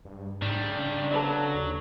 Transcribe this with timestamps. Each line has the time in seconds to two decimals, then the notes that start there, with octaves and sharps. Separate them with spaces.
0.05 G2
0.42 G#2 D#3 G3 D4
0.66 C#3
1.11 F#3 A4 B4 D5
1.55 D#2